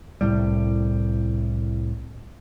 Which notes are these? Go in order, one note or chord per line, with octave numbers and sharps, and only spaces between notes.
C2 A2 G3